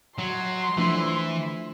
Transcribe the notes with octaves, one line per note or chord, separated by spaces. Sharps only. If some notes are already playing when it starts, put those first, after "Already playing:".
F#3 C6
E3 F3 A3 D4